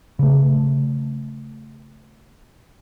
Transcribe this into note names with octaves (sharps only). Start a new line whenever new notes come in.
C#3 A3